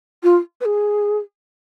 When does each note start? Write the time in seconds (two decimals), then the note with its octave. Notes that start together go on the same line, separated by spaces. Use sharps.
0.23 F4
0.61 B4
0.65 G#4